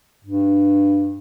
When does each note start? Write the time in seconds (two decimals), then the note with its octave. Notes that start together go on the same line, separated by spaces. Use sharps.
0.25 G2